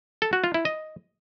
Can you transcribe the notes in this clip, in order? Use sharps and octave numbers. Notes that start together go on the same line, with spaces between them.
A4
F#4
F4
E4
D#5